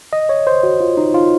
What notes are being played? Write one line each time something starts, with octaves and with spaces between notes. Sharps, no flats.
D#5
C#5
C5
F#4
F4
D#4
F4